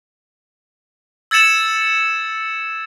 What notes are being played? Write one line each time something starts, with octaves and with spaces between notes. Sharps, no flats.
E6 G#6 A6 C#7 E7 F#7